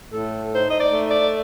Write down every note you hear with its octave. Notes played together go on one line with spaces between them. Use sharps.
A2 A4
D#4 C5
D#5
D5
A3
D5